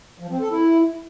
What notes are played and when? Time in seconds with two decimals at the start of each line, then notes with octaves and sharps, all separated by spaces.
0.19 F3
0.30 C4
0.40 A4
0.50 E4